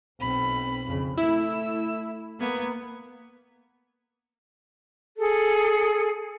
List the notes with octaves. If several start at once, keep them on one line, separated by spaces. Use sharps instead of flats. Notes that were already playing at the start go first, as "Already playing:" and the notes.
B1 C4 B5
F2 C#3
A3 E4 E6
A#3 B3 G#6
G#4 A4